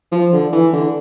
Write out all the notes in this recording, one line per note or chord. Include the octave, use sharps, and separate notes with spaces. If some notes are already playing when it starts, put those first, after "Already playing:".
F3
D3
E3
D3